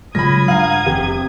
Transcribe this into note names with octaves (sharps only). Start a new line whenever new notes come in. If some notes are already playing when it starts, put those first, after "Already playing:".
C#3 F#3 G#3 F4 B5 D#6 G#6 A#6
G2 F5 F#5 G#5 A#5
F1 C3 C4 G5